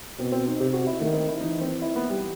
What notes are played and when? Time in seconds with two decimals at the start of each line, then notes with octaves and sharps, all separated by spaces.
0.19 B2 C4
0.32 C4
0.46 D#4
0.60 C3 G4
0.73 F#4
0.87 E4
1.00 D#3 A3
1.14 C4
1.28 E4
1.41 E3 D#4
1.61 C4
1.82 E4
1.96 B3
2.09 G3